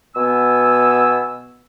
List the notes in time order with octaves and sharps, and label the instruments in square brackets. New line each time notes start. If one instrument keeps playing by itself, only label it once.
[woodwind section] B2 B3 G#5 E6